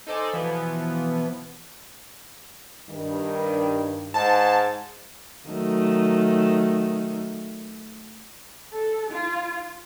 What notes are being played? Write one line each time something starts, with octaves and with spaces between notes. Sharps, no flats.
D#4 A4 C5 D5 G#5
B2 E3 F3 B3
G2 D#3
G#2 A5
D#3 F#3 A3
A4
F4